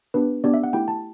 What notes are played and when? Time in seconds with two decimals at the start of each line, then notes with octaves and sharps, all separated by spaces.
0.14 B3 D4 G4 B4
0.44 B3 D4 G4 D5
0.54 E5
0.64 F#5
0.73 A3 E4 G4 G5
0.88 A5